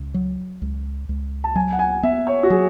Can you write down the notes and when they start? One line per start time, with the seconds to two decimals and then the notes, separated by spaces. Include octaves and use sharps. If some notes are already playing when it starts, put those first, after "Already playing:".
Already playing: C#2
0.14 F#3
0.62 C#2
1.09 C#2
1.44 A5
1.55 F#3 G#5
1.72 F#5
1.79 G#5
2.03 B3 E5
2.27 C#5
2.43 F#4
2.50 F#3 G#4